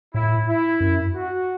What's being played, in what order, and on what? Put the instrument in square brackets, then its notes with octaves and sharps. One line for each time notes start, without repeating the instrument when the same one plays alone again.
[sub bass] A2 [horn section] E4
[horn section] E4
[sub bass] F#2
[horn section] F#4